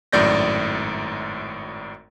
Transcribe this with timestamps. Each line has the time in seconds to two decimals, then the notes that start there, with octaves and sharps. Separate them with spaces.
0.13 G#1 F#2 A2 D5 G6 A#6